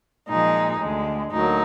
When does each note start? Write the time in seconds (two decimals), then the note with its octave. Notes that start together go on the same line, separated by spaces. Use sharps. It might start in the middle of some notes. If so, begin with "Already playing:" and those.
0.28 A#2 F3 G#3 D#4
0.80 D2 D3 G#3
1.31 D2 D3 F#3 A#3 D#4